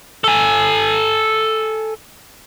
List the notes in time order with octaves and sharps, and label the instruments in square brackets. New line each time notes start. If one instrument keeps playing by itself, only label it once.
[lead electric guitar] A4 G#5